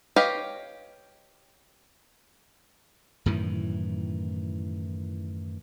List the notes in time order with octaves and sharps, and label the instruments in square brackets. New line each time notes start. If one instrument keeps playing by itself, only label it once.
[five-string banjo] G4 B4 C#5 D#5 F5
[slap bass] F#2 A2 D#3 E3